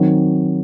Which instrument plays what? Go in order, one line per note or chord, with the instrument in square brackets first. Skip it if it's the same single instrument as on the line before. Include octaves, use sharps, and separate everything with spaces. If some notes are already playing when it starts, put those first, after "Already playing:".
Already playing: [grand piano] D#3 F#3 C4